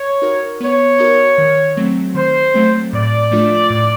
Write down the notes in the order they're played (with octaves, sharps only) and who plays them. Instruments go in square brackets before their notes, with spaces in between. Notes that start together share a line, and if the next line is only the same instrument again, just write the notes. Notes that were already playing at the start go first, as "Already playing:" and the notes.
Already playing: [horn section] C#5
[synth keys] D#4 F#4 A#4
[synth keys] B3 [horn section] C#5
[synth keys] D#4 F#4 A#4
D#3
F#3 A3 C4
[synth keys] D#3 [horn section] C5
[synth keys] F#3 A3 C4
[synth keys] A2 [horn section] D5
[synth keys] F3 A3 D4 F4
A2